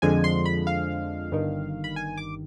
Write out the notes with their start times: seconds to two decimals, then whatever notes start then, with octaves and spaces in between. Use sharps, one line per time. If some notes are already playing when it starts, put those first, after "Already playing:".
0.02 F2 D3 F3 G#3 G#5
0.24 C6
0.46 B5
0.67 F5
1.32 G1 G2 D#3
1.84 B5
1.96 G#5
2.17 D6